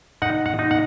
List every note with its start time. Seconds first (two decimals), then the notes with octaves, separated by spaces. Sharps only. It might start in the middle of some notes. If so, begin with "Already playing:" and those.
0.22 D#4 F#5
0.46 F#5
0.59 D#4
0.71 F#5